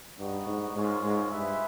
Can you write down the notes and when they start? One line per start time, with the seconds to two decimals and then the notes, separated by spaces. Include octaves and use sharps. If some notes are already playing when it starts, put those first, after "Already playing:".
0.19 G2 B3 D#4 F#4
0.47 G#2
0.75 G#2 G#3 C#4 F4 A#4 C#5
1.03 G#2
1.32 G2 F4 G#4 B4 E5